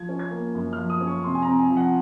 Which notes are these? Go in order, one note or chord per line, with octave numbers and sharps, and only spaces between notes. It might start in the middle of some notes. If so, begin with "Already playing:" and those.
Already playing: F3 G#6
C#4
G#6
A#3
F#2
F6
F3
D#6
C#4
C#6
C3 C6
G#5
C4 A#5
G#5
F3
F#5